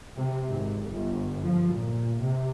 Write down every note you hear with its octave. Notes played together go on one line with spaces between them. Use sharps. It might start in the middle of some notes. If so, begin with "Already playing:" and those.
C3
G#1
G1
F3
A#2
C3